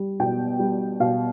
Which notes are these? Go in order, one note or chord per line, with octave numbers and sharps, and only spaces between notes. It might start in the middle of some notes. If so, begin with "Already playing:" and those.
Already playing: G3
B2 G5
G3
B2 F5